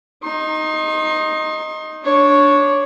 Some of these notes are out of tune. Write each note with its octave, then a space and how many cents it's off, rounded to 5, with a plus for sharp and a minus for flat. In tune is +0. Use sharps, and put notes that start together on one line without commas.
D#4 +0 C6 +35
D4 -10 C#5 +0